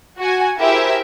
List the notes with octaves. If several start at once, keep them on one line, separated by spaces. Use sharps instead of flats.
F#4 G#5
E4 G4 G#4 A#4 C5 E5